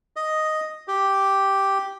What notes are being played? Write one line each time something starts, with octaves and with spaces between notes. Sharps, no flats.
D#5
G4